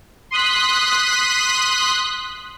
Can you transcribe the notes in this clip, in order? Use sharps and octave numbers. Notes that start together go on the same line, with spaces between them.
C6 D#6 F#6 B6